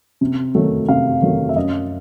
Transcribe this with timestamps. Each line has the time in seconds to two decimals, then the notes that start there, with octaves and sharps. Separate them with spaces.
0.21 C3
0.55 D#3 F#3 A3
0.89 C3 F5
1.22 D#3 F#3 A3
1.49 E5
1.56 F#2 D#5